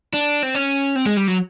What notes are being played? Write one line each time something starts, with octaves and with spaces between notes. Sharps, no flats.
D4
C4
C#4
C4
G#3
G3
F#3